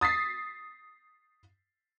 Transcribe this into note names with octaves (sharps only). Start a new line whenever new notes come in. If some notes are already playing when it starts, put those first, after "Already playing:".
D#6 A6 B6 C7